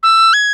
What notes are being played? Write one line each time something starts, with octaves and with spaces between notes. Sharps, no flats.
E6
G#6